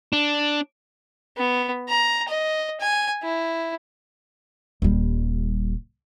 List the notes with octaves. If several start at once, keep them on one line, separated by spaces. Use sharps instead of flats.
D4
B3
A#5
D#5
G#5
E4
D#1 G3